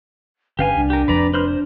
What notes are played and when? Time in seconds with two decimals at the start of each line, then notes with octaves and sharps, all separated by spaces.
0.59 G1 D3 C#4 G4 B4 F5 G#5
0.76 C2 D4
0.90 G4 A#4
1.08 F1 F2 B4 D5 A#5
1.34 D4 B4 C5 F6
1.48 C5